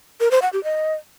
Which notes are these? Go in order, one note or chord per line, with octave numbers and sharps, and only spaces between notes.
A#4
C5
F#5
G4
D#5